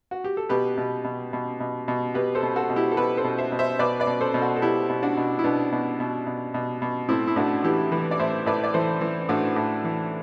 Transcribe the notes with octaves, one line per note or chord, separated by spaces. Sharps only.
F#4
G4
A4
B2 G4 B4
B2
B2
B2
B2
B2
B2 G4 B4
A4 C5
B2
F#4 A4
B2
E4 G4
A4
B2 G4 B4
A4 C5
B2
C5 E5
B2
C5 E5
B2 B4 D5
B4 D5
B2
A4 C5
B2
F#4 A4
A4
B2 E4 G4
B2
D4 F#4
B2
E4
B2 B3 D4
B2
B2
B2
B2
B2
A2 C4 E4
E4
A2 D4 F#4
E3 E4 G4
E3 G4 B4
D5
A2 C5 E5
A2 B4 D5
D5
E3 A4 C5
E3
A2 D4 F#4
A2
E3